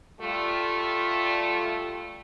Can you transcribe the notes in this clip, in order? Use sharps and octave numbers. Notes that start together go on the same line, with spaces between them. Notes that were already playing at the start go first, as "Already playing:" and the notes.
G3 A3 F4